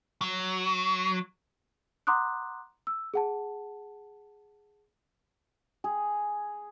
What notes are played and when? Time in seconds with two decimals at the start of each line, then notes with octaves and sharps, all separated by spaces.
0.21 F#3
2.07 F#5 A#5 C6 D6 D#6 F#6
2.87 E6
3.14 G#4 F#5 A5
5.84 G#4